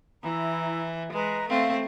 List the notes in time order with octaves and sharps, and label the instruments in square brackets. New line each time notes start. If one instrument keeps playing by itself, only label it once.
[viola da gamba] E3 [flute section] E4 A#5
[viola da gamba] G#3 [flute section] B4 A#5
[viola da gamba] A3 C4 [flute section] F5